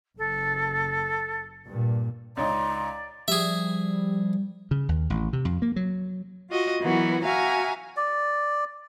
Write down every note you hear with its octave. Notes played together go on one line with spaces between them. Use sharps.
F#1 A4
G2 A#2
C#2 C#4 D#4 D5 A#5 C6
F3 G3 G#4 E5
C#3
D#2
A1
C3
F2
A#3
F#3
F4 F#4 D#5 F#5
E3 F#3 B3 F#4 A#4
F#4 E5 F5 G#5 A#5
D5